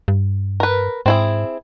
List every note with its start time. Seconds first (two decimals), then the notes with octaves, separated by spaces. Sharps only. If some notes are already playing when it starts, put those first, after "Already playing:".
0.08 G2
0.60 A#4 B4
1.06 G#2 C4 E4 G#4